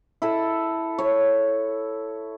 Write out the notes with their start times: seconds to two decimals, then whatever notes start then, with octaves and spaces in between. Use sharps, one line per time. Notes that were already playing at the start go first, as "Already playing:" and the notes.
0.22 E4 A4
0.98 C#5